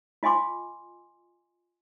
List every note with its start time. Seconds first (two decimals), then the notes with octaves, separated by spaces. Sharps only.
0.23 F4 D#5 G#5 C6 D6